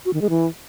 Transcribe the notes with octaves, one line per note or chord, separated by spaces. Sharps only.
F#4
D#3
G#3
E3